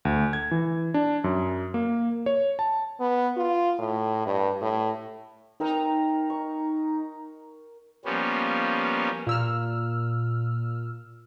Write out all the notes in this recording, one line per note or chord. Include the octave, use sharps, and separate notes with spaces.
D2
G#6
E3
D4
F#2
A#3
C#5
A5
B3
F4
A2
G2
A2
C4 D#4 A#4 A#5 E6
C#6
F3 G3 A#3 B3 C#4
A#2 E6 F6